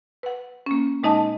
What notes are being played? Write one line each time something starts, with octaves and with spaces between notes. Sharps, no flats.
B4 F#5
A#3 C#4
A#2 G#3 D#4 D#5 A5